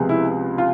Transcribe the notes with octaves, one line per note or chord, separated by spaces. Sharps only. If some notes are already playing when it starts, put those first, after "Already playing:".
Already playing: C#2 C3 F3 G#3 B3
E4
F4